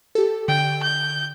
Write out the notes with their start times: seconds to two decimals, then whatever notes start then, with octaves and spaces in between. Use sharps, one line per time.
0.15 G4 A4
0.48 D3 G5
0.82 G6